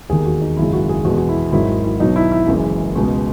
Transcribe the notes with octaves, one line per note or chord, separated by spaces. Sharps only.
E1 D#2 D#3 G#4
F#4
D#4
G#1 F#2 C#3 G#3 E4
F#4
G#4
E2 B2 G#3 F#4
F#4
E4
G#1 G#2 D#3 F#3 E4
E4
B1 B2 F#3 D#4
E4
E4
F#1 F#2 E3 G#3
C#2 B2 G#3